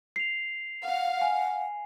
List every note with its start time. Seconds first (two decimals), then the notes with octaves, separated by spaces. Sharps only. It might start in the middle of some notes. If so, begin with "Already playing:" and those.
0.16 C7 F7
0.83 F5 F#5
1.21 G#5